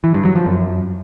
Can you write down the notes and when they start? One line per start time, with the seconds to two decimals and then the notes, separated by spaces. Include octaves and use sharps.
0.04 E3
0.14 G2
0.25 F#3
0.36 F3
0.46 F#2